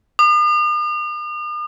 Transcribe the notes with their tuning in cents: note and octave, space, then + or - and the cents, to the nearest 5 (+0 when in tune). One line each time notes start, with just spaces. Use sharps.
D#6 -45